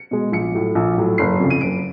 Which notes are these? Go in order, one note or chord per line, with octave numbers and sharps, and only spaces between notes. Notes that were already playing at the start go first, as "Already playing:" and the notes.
Already playing: C#7
B2 G#3
A#1 C#7
A2 F#3
A#1
A2 F#3
F#1 C7
F2 C#3
D#7
F#1 D7